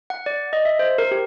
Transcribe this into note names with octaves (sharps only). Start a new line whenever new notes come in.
F#5
D5
D#5
E5
C5
A#4
G4